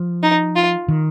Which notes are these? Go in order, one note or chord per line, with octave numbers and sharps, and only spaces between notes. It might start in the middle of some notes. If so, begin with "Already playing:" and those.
Already playing: F3
D#4
F4
D#3